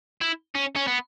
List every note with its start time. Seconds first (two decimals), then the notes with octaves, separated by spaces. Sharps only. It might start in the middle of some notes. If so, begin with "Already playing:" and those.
0.22 E4
0.55 C#4
0.75 C#4
0.87 B3